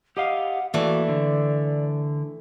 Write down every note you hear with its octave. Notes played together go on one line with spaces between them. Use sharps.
G4 D#5 F5 F#5
E3 A3 A#3 F#4 D5
D3